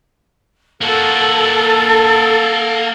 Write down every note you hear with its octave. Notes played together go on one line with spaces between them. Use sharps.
A#3 F#4 A4